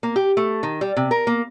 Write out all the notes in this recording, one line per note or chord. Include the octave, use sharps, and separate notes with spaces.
A#3
G4
A3
D#3
G3
C3
A#4
A#3